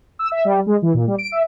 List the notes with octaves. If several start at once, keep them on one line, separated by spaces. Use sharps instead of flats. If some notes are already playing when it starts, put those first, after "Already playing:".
E6
E5
G3
G#3
E3
A#2
G3
D7
E5